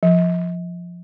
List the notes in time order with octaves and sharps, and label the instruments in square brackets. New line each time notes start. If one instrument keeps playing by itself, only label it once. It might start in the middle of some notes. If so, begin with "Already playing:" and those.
[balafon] F3